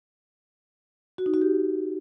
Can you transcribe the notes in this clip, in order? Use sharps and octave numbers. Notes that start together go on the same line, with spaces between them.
F#4
D#4
F#4
G4